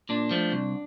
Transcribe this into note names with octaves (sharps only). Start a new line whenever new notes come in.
A#2 D4
F3 A3
C2